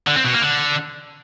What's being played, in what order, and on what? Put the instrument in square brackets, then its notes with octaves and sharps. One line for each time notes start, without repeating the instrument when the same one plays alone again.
[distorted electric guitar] D3
C4
B2
A#3
D3